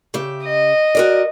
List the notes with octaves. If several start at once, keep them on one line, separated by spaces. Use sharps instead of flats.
C#3 G4 E5
D#5
F#4 A#4 D5